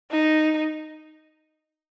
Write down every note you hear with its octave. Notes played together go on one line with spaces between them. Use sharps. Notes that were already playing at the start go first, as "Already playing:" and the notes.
D#4